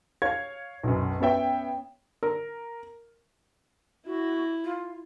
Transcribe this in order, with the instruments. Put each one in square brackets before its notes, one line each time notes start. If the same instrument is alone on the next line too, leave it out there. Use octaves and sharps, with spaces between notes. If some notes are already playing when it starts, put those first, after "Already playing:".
[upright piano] C#5 F5 G#6
B1 F#2
B3 C#4 C#5 E5 G5
[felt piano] A#4
[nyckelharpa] E4 [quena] F#4
[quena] F4